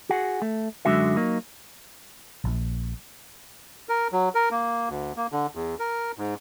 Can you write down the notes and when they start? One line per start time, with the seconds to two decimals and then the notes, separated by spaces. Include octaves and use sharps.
0.09 F#4 G#4 F#5
0.42 A3
0.85 F#2 D3 G#3 F#4 E5
1.16 F#3 A#3 D#4
2.44 A#1
3.89 A#4
4.12 F#3
4.35 A#4
4.52 A#3
4.89 D2
5.17 A#3
5.32 D3
5.55 E2
5.79 A#4
6.18 G#2